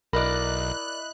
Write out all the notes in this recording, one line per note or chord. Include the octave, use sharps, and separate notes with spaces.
B1 E4 A#4 D5 D#5 B5 F#6